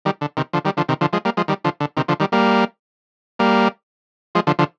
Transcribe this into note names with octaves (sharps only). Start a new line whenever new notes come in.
D#3 G3
D3
C3 D#3
D3 F3
D#3 G3
D3 F3
C3 D#3
D3 F3
F3 G#3
G3 A#3
F3 G#3
D#3 G3
D3 F3
D3
C3 D#3
D3 F3
D#3 G3
G3 A#3
G3 A#3
F3 G#3
D3 F3
D3 F3